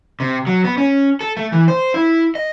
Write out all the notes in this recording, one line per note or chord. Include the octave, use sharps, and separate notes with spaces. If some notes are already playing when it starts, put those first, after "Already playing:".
C3
F#3
B3
C#4
A4
A3
E3
C5
E4
D#5